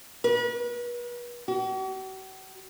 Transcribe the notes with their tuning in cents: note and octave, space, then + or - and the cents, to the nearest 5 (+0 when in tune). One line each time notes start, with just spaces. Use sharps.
B4 -40
F#4 +45